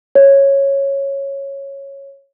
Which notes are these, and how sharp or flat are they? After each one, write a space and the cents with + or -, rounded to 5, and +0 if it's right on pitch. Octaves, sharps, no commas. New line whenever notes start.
C#5 -10